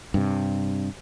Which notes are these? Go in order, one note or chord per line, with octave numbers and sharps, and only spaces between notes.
G2 C3